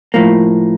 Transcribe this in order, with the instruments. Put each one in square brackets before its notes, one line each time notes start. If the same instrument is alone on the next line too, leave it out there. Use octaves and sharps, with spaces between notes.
[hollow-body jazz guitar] A2 F3 A#3